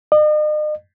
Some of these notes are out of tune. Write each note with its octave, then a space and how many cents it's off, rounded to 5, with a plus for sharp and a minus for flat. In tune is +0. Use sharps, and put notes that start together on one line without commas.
D#5 -45